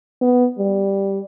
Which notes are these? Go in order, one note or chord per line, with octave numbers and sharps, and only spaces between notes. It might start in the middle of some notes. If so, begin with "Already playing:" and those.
B3
G3